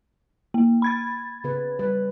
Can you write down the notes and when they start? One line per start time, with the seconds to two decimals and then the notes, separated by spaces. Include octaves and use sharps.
0.54 A#3
0.82 B5 G#6 A6
1.44 C#3 B3 B4
1.79 G3 B4